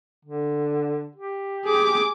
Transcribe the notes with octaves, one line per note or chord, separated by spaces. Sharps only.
D3
G4
G#4 D6